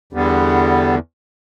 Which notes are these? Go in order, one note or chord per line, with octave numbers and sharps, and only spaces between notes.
E2 D3 G3 B3